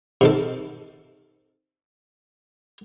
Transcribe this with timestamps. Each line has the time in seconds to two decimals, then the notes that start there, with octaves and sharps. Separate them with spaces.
0.21 C3 D#3 A4